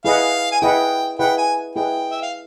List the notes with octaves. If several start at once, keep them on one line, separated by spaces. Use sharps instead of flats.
E4 G#4 B4 D#5 F5 F#5
G#5
E4 G#4 B4 D#5 F#5 G5
E4 G#4 B4 D#5 F#5 G5
G#5
E4 G#4 B4 D#5 F#5 G5
E5
F5